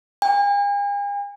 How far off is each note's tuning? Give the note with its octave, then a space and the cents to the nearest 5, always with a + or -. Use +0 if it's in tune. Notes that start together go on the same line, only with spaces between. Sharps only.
G#5 -45